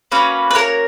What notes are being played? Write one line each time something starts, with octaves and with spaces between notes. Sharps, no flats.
A#3 C#4 F#4 B4
B4
A#4 C#5